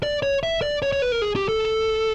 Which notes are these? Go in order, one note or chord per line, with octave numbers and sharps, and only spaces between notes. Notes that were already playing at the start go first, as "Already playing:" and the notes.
D5
C#5
E5
D5
C#5
C#5
B4
A#4
G#4
G4
A4